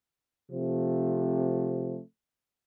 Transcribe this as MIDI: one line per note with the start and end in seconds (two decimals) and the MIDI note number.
0.50 2.01 48
0.50 2.01 53
0.50 2.01 57
0.50 2.01 60